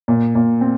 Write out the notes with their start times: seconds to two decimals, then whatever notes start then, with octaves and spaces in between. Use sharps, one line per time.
0.08 A#2
0.35 A#2
0.61 C4